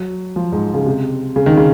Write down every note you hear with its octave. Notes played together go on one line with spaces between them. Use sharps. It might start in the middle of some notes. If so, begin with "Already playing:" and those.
Already playing: F#3
F3
G#2
C#3
C3
C#3
D#3
C#3